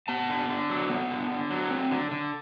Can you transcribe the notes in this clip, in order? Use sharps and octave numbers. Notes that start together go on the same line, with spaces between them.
B3 A5
D3
D3
F#3
B3
D3
D3
F#3
C4
D3
D3